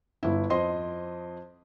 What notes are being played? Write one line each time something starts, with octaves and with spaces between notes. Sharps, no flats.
G1 E4
F2 D#5 C6